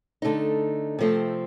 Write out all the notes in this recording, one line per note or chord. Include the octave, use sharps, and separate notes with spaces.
D3 A3 D#4
C3 F3 A3 C4